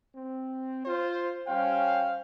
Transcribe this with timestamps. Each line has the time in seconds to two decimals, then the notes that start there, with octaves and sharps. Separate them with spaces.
0.14 C4
0.85 F4 C5
1.48 G3 C#4 C5 F5 G5